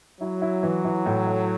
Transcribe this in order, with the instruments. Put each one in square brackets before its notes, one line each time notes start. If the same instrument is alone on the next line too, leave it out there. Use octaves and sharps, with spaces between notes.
[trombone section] F#3 [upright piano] E4
[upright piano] E4
E3
E3
A2
A3